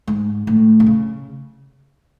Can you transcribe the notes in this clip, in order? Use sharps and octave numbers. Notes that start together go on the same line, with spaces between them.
G#2
A2
B2
C#3